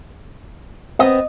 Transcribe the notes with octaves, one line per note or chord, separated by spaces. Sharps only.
B3 C4 D#5